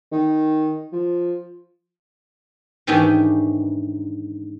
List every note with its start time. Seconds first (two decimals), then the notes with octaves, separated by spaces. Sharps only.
0.12 D#3
0.92 F3
2.87 G#2 D#3 E3 C#4 D4 G4